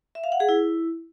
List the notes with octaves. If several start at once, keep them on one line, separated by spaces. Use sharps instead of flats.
E5
F5
F#5
G#4
E4